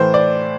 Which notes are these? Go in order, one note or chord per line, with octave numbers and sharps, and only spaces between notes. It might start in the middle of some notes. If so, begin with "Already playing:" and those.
Already playing: A2 E3 C5
D5